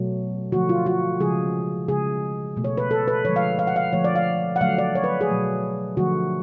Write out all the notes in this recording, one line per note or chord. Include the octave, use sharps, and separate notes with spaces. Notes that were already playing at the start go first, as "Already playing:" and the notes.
Already playing: B2 F#3 A3
D3 F3 A3 F#4
F4
F#4
C#3 F3 G#3 G#4
C#3 G#3 G#4
B2 A3
C#5
B4
A4
B4
D3 F3 G#3 C#5
F5
F5
F#5
F5
D3 F3 A3 C#5
D5
F5
F#5
D3 F#3 A3 F5
D5
C#5
B4
G#4
B2 F#3 A3
D3 F3 A3 F#4